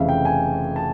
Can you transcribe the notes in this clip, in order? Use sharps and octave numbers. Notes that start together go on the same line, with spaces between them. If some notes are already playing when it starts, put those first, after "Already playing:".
Already playing: F1 F2 C#3 E3 E5 F5
G5
G#5
A5